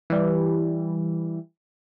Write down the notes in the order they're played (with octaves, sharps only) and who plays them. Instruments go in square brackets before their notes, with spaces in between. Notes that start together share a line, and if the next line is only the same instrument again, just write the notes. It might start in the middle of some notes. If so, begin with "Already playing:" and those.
[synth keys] E3 G3